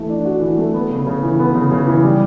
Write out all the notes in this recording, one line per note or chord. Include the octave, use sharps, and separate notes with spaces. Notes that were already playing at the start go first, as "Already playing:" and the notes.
Already playing: E3 A3
D4
F#4
E3
A3
B3
C#3
C#3
E3
B3
C#3
C#3
E3
G3